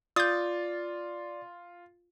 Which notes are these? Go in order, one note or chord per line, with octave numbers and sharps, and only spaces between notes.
F4 D5 D#6 G6 A6